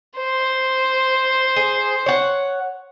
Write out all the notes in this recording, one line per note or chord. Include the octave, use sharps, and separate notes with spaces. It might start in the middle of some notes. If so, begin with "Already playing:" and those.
C5
G#4
C#5 F#5